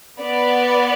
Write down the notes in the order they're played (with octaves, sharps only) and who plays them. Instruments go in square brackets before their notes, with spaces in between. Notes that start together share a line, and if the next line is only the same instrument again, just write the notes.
[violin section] B3 D5